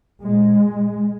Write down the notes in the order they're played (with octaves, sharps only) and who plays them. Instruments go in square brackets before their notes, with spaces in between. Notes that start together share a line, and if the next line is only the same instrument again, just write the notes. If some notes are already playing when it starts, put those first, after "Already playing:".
[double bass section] A#2 G#3